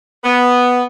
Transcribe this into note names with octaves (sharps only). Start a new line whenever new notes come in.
B3